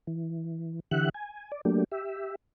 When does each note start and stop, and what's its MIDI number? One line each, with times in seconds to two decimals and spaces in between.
0.07 0.80 52
0.91 1.09 50
0.91 1.09 52
0.91 1.09 67
0.91 1.09 76
0.91 1.09 78
0.91 1.09 90
1.14 1.51 80
1.52 1.61 74
1.65 1.84 54
1.65 1.84 57
1.65 1.84 58
1.65 1.84 62
1.65 1.84 67
1.92 2.35 67
1.92 2.35 76